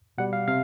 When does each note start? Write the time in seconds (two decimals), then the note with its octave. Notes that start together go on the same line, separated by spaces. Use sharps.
0.18 B2 G3 F#5
0.33 F5
0.48 C3 F5